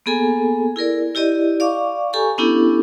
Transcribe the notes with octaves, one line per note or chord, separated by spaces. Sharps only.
A#3 B3 G#4 A4 G#5
E4 G#4 A#4 D5
E4 G4 D5 D#5
D5 F5 C#6 D6
G4 A4 G#5 A#5 C#6
B3 C#4 D4 E4 G4 A4